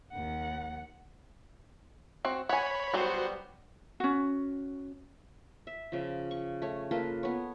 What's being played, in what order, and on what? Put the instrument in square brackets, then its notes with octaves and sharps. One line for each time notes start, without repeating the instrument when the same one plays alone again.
[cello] D#2 F#5
[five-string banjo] C4 F#4
[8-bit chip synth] C#5 B5 [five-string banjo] F#5 G#5
[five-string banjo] F#3 G3 B3 [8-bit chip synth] F#4 C5
[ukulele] C#4 F#4
[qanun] E5
C#3 F3
C#6
A3 C#5
A#3 F4 A4 B4
B3 C#5